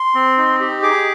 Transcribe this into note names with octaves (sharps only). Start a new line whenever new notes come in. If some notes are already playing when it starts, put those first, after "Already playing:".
Already playing: C6
C4
D#4
G4
G#4 D6